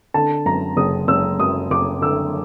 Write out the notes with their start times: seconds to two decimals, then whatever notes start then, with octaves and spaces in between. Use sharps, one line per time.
0.14 D3 A5
0.46 F#2 A#5
0.77 F#1 D#6
1.08 F#1 E6
1.40 F#2 D#6
1.70 F#1 D6
2.02 D3 E6